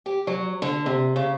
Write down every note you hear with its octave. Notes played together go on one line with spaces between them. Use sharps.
G4
F#3
D3
C3
C#3